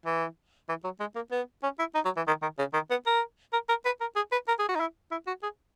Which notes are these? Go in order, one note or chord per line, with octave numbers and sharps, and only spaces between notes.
E3
E3
F#3
G#3
A#3
B3
C#4
E4
D#4
F#3
E3
D#3
D#3
C#3
D#3
B3
A#4
A#4
A#4
B4
A#4
G#4
B4
A#4
G#4
F#4
D#4
E4
E4
F#4
G#4